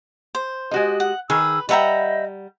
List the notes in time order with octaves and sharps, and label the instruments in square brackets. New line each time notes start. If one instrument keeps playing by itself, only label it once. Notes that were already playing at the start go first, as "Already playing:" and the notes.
[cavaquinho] C5
[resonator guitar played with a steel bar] G#3 F#4 D#5 [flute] G4
[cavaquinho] F#5
[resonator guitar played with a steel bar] D#3 G#4 [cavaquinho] B4 [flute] E6
[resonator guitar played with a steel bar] G3 F#5 A#5 [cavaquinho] B4 E5 G5 [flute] D#5